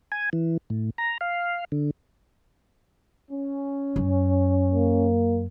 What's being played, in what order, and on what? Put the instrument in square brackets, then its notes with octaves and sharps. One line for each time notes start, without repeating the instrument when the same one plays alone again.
[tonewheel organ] G#5
E3
A2
A#5
F5
D3
[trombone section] C#4
[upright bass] F#2
[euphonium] A#3